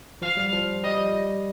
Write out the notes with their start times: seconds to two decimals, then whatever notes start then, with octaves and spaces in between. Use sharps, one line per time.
0.22 F3 F5
0.37 G3
0.53 F3
0.84 G3 D#5